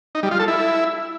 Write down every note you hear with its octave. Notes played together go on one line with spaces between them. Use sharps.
D#4
G3
F4
A4
E4